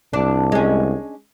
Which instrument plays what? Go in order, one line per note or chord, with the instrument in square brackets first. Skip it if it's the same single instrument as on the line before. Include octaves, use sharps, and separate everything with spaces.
[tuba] C2 [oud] D4
[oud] G#3 C#4